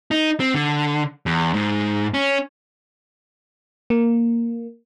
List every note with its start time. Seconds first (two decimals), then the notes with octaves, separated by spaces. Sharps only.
0.11 D#4
0.40 C4
0.54 D3
1.26 E2
1.54 G#2
2.14 C#4
3.90 A#3